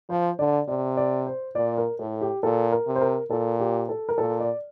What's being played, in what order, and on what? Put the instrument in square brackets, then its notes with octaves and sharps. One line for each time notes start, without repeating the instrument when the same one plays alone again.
[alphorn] F3 [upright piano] C5
[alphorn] D3 [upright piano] D5
[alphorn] C3 [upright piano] D5
[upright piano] D5
C5
[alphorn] A#2 [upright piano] D5
[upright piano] A#4
[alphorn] A2 [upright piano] A4
[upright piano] G4
[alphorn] A#2 [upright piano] A4
[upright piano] A#4
[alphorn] C3
[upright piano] C5
A#4
[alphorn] A#2 [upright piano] A4
[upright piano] G4
A4
A#4
[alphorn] A#2 [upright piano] A4
[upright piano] D5